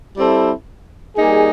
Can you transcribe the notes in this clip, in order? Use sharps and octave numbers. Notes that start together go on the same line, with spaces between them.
G3 C4 E4 A4
G3 A#3 D#4 G#4